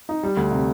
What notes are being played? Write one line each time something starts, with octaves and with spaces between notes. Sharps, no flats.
D#4
G3
D2
C3